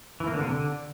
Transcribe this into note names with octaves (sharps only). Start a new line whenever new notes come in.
E3
A#3
D3
C3
D3